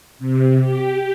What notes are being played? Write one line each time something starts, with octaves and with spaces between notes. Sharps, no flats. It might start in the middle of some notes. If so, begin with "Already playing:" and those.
C3
G4